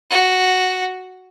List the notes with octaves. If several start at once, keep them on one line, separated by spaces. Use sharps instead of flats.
F#4